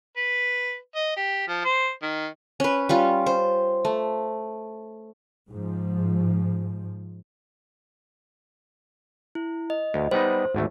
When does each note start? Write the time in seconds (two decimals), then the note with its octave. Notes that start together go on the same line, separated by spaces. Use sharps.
0.17 B4
0.95 D#5
1.17 G4
1.48 F3
1.65 C5
2.02 D#3
2.60 C#4 B4
2.89 G3 C#4 F4
3.26 C5
3.85 A3
5.49 G#2 F3
9.35 E4
9.70 D#5
9.94 D2
10.11 G3 B3 D#4 C5
10.55 G#1 D2 A3